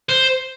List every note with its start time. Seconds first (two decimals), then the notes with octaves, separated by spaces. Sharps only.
0.09 C5